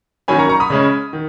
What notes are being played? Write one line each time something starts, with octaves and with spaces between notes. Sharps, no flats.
D#3 F#3 A#3 C#4 G#5 B5
A#5 C#6
A#5 C#6
B5 D#6
C#3 G#3 C#4
D#3